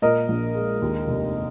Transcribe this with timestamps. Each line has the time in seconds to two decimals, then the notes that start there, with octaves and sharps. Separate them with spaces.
0.02 A#2 A#4 D#5
0.28 A#1
0.55 G#3
0.82 D#2
1.07 F1